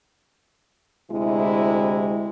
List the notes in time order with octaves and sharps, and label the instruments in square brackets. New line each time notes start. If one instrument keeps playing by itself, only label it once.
[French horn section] D2 C3 G#3 E4